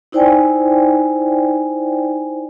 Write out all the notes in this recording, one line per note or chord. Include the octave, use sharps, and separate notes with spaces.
D#4 E4 C5 D5 G5 G#5